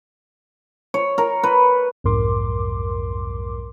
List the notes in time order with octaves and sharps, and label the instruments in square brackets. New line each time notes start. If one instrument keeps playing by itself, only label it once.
[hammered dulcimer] C#5
A#4
B4
[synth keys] B1 F2 G#2 A#4 C6 D6